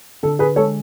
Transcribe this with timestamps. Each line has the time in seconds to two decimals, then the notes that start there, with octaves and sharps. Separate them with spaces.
0.23 D3 A4
0.39 G#4 B4
0.56 G#3 A4 C#5